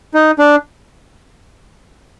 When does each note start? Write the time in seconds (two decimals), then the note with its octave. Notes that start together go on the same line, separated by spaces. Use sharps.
0.14 D#4
0.39 D4